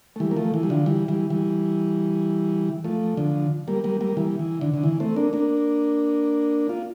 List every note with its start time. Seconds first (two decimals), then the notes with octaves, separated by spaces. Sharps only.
0.16 A3
0.20 E3 G3
0.31 A#3
0.37 F3 A3
0.54 E3
0.63 G3
0.70 D3 F3
0.86 E3 G3
1.08 E3 G3
1.30 E3 G3
2.84 F3 A3
3.17 D3 F3
3.68 G3 A#3
3.84 G3 A#3
4.01 G3 A#3
4.17 E3 G3
4.39 E3
4.61 D3
4.74 D3
4.84 E3
5.00 A3 C4
5.16 A#3 D4
5.33 A#3 D4
6.69 F4